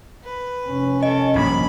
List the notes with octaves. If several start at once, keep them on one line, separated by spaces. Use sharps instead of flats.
B4
F1 C#4
A4 D#5
A#1 G2 B5